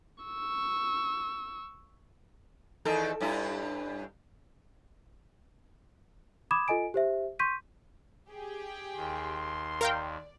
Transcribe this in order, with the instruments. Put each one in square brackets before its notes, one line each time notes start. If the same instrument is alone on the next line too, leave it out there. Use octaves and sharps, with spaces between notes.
[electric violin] C#6 E6
[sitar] E2 D#3 A4
G2 C#4 E4
[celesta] B5 D6 D#6 G#6 E7
F4 A4 D#5 G#5 D7
G4 C5 E5
C6 C#6 G6 B6 D#7
[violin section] G4 G#4 G5
[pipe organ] D#2 [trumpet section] C6
[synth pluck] A#4 F5 G5 [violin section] D5